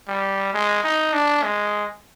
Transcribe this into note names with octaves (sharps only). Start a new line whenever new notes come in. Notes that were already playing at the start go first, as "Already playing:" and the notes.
G3
G#3
D#4
D4
G#3